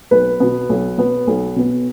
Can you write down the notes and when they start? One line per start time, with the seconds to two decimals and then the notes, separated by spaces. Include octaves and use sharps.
0.11 B1 B4
0.40 B2 B3
0.69 B1
0.98 B2 B3
1.27 B1
1.56 B2 B3